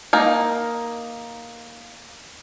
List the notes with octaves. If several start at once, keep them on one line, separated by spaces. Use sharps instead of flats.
A#3 D#4